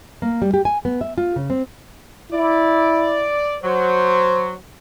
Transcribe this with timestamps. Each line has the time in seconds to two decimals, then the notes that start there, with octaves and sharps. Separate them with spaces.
0.22 A#3
0.42 G3
0.54 G4
0.65 G#5
0.85 B3
1.01 E5
1.18 F4
1.36 C#3
1.50 C4
2.32 E4 D5
3.63 F#3 C5